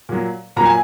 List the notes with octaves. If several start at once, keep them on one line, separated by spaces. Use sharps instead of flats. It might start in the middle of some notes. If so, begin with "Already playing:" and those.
A#2 F#3
A#2 F#3 A#5
G#5